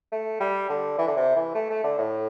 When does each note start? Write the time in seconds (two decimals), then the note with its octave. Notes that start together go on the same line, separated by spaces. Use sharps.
0.12 A3
0.40 G3
0.69 D3
0.98 E3
1.07 D3
1.17 C3
1.36 E3
1.55 A3
1.70 A3
1.84 D3
1.98 A2